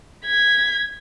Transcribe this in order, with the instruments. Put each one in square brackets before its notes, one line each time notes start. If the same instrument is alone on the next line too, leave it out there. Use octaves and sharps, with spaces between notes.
[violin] G#6 B6